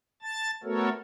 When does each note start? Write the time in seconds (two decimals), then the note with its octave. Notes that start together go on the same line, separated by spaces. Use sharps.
0.22 A5 A6
0.64 A3 B3 F#4 A4 A#4 C#5